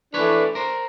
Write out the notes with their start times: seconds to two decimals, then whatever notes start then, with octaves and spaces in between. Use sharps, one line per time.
0.14 E3 A3 D4 B4 C#5
0.55 A#4 C5